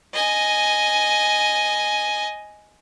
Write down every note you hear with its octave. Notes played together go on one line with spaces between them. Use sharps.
D#5 G#5